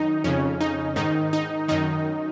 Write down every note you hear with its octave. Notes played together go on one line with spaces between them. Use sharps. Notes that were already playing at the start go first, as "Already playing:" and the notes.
Already playing: F#2 D#3 D#4
F2 C#3 C#4
D#4
G#2 D#3 D#4
D#4
F#2 D#3 D#4